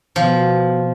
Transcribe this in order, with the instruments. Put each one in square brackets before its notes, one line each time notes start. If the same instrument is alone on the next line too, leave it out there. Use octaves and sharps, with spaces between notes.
[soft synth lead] B2 [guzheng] F3